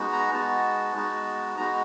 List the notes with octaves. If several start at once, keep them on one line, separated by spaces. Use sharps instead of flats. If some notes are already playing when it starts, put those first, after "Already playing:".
Already playing: G#3 B3 D#4 F#4
A#5
G#3 B3 D#4 F#4 A5
G#3 B3 D#4 F#4
G#3 B3 D#4 F#4 A#5